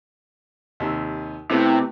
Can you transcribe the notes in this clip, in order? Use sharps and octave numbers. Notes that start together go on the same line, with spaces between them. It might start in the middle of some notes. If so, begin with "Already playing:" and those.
D#2 C3 E6
C3 A3 B3 E4